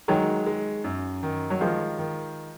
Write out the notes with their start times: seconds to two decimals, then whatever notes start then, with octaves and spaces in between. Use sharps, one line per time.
0.08 D#3 F#3 G#3
0.46 G#3
0.84 F#2
1.23 D#3
1.50 F#3
1.61 D#3 F3 G#3
1.99 D#3